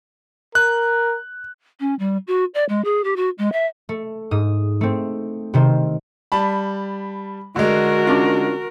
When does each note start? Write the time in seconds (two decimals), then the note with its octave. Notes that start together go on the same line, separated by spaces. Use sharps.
0.55 A#4 F#6
1.80 C#4
1.99 G3
2.27 F#4
2.54 D5
2.69 G#3
2.85 G#4
3.04 G4
3.16 F#4
3.38 G#3
3.52 E5
3.89 A3
4.31 G#2 D#6
4.81 A3 C4
5.54 C3 D#3 C4
6.32 G3 A5 B5
7.56 D3 G#3 F#4 A#4
8.07 C#4 D4 F4